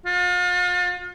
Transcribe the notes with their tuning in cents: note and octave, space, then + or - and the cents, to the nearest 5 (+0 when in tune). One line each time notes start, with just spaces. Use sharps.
F4 +40